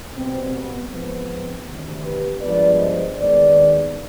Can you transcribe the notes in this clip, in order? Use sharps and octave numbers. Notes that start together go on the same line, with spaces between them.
B2 G3 B3 C4
B3
G#2 F3 B3 C4
D2 C3 D#3
G4 B4
G2 F3 G#3 B3 B4 D5
C5 D#5
D#2 D#3 G#3 B3 B4 D5